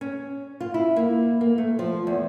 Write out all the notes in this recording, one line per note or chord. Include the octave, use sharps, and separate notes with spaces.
C#4
F4
E4
A#3
A#3
A3
F3
E2